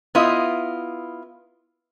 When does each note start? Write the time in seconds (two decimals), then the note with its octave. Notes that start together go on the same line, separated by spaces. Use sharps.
0.15 B3 E4 F4 D#5